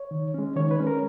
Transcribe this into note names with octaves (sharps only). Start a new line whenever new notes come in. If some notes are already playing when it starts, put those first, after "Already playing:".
Already playing: C#5
D#3
G#3 C#4
D#3 C#5
B4
G#3 C#4
A#4